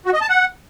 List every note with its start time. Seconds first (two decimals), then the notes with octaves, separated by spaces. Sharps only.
0.05 F#4
0.13 D#5
0.21 A5
0.29 F#5